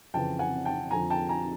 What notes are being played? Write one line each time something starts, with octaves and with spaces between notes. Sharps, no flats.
F2 C#3 E3 G5 A5
F#5 G#5
G5 A5
F2 D3 F3 G#5 A#5
G5 A5
G#5 A#5